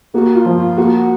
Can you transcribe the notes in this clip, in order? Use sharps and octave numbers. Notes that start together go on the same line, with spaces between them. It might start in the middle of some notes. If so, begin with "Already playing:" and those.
A#3 F#4
F4
F3
F4
A#3 F#4
F#4